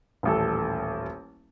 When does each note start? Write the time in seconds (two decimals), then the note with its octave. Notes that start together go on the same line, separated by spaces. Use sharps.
0.23 D#1 A1 A4